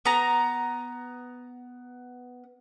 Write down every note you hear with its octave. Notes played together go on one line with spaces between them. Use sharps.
B3 A#5